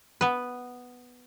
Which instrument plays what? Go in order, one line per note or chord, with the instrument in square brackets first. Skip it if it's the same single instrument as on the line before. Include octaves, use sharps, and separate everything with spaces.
[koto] B3 B4